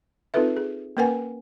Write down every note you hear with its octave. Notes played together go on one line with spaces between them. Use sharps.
C4 D#4 F4 A4 B4 E5
G#4
A#3 C#4 A#4 B4 F#5 G#5